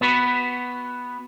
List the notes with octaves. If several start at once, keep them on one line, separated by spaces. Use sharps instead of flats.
B3 F#4 B4